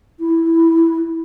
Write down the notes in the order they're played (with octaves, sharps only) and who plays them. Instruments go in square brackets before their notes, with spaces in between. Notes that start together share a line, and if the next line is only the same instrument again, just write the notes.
[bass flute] E4